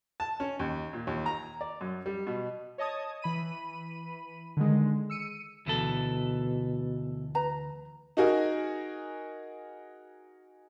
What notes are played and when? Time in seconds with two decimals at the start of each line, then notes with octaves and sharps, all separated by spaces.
0.20 A5
0.40 C#4
0.60 D#2
0.93 A#2
1.07 D#2
1.26 A#5
1.61 D5
1.81 F#2
2.06 G3
2.27 B2
2.78 C#5 D#5 A5 D#6 G#6
3.22 E3 B5 D#7
4.57 D3 D#3 G#3
5.10 E6 C#7 D#7
5.66 D2 B2 E3 A4
7.35 B4 A#5
8.17 D#4 F#4 G#4 A#4